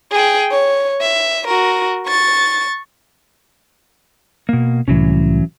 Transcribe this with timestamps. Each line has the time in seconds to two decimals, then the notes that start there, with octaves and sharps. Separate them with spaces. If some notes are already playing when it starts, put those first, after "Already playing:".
0.12 G#4 G5
0.52 C#5
1.01 E5
1.47 F#4 A#4
2.07 C#6 A6
4.49 B2 A#3
4.88 C2 A2 E3 F#3 C#4